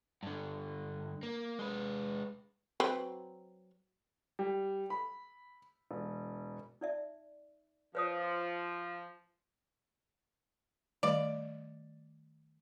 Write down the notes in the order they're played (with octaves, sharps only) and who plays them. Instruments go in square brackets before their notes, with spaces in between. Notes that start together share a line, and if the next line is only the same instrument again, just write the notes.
[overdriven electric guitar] G2 D3
A#3
G#3 B4
[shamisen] F#3 C4 B4
[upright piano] G3
B5
E1
[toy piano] D#4 D5 E5
[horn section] F3 [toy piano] B4 C#5 D#6
[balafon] D#3 G3 A3 [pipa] D5